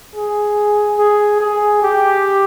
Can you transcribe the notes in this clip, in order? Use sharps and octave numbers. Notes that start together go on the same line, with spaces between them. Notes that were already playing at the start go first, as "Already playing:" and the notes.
G#4
G#4
G#4
G4